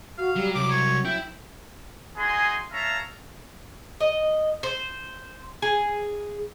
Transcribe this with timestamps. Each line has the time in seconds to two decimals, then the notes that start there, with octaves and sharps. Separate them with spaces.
0.18 F#4 F5
0.36 F#3 G3
0.55 C2 F#3 D6
0.70 C#5
1.05 E4 G5
2.17 D#4 F#4 G#4 G#5 C6
2.72 C#5 E5 F5 A5 A#5
4.01 D#5
4.63 C5
5.62 G#4